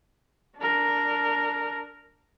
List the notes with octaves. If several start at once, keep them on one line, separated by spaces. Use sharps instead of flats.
D4 A#4